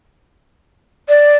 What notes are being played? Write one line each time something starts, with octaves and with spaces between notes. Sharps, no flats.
D5